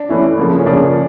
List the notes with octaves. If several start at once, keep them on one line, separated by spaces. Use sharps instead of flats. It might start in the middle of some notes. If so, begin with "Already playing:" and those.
Already playing: D4
E3 A3 C#4 E4
C#3 F3 A#3
C#4
C#3 F3 A#3 D4